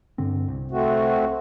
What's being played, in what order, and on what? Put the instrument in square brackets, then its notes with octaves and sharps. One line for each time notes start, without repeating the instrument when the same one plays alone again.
[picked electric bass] G2 D3 C4
C2
[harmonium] A3 C4 F#4